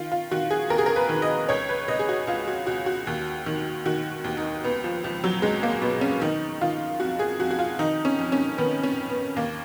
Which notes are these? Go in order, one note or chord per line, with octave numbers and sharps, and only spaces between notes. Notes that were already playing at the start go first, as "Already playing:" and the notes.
Already playing: D#3 F4
F4
D#3 F#4
G#4
D#2 A#4
G#4
A#4
B4
D#3
D#5
C#2 C#5
B4
C#2 D#5
G#4
F#4
C#2 F4
F#4
C#2 F#4
F#4
D#2
D#3
D#3 F#4
D#2
D#4
C#2 B3
F3
C#2 F3
F#3
C#2 G#3
A#3
B2 B3
C#4
D#3 D#4
D#3 F4
F2 F#4
G#4
F2 F#4
F#4
F4
D#3 D#4
C#4
F2
C#4
D#3 B3
C#4
F2
B3
D#2 A#3